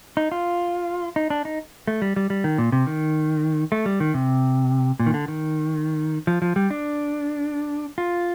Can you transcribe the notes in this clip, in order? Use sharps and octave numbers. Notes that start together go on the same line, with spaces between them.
D#4
F4
D#4
D4
D#4
A3
G3
G3
G3
D#3
A#2
C3
D#3
A3
G3
D#3
C3
A#2
D#3
D3
D#3
F3
F3
G3
D4
F4